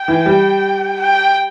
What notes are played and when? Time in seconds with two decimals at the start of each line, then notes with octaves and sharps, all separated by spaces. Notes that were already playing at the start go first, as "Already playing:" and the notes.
Already playing: G5
0.08 E3
0.26 G3
1.00 G5